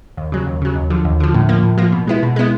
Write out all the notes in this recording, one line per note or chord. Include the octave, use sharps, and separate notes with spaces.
D#2
C#3 F#3
D#2
C#3 F#3
D#2
D3 F3
D#2
D3 F3
A2
F3 A#3
A2
F3 A#3
B2
G#3 B3 E4
B2
G#3 B3 E4